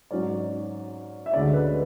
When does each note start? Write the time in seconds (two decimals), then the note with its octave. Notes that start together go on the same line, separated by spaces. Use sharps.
0.11 G#2 F#3 C#4 D5
1.26 E5
1.32 D2 D3 G#3 C#4 D5
1.54 B4